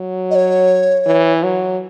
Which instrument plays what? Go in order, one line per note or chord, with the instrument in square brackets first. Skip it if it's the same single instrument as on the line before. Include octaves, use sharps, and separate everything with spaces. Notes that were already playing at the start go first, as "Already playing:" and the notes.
Already playing: [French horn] F#3
[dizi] D#5
C#5
[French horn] E3
F#3